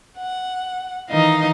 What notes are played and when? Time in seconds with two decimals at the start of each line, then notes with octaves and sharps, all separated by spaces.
0.18 F#5
1.09 D#3 E3 D#4 D#5 F5